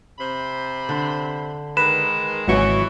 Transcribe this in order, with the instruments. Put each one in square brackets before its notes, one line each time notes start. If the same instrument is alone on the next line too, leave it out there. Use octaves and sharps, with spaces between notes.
[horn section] C3 C5 B5
[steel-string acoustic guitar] D3
[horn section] D#3 G#3 [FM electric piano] B4 [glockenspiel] E7
[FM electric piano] G#1 F#3 C#6 [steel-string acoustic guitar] C#3 F#4 D#5 [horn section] E3